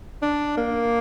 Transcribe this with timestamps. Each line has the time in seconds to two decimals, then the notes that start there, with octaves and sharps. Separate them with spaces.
0.22 D4
0.57 A#3